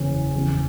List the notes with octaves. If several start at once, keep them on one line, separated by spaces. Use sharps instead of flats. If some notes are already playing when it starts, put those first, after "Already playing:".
Already playing: F#1 E2 C#3 E3 C#4
F#1 E2 C#3